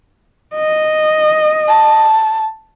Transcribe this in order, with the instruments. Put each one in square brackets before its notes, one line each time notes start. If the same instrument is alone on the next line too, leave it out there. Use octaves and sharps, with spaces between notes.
[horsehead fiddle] D#5
[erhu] A5